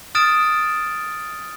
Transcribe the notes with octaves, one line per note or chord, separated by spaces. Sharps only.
D#6 F6 A6 D7 E7